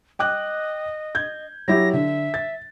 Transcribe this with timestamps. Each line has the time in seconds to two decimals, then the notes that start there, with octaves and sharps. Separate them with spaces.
0.19 D#5 G5 D6 F#6
1.15 G6 G#6
1.68 F#3 E4 G4 A#6
1.93 D3 E5
2.34 A6